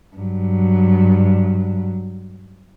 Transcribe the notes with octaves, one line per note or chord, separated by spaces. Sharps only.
G2 F#3